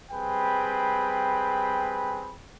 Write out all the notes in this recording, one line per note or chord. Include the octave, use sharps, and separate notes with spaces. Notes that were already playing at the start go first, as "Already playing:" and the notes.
G3 C4 G#4 B4 G5 B5